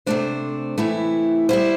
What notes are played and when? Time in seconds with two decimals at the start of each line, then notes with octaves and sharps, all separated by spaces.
0.06 C3 A3 D4 C5
0.78 C3 E3 A3 E4
1.49 G3 E4 C5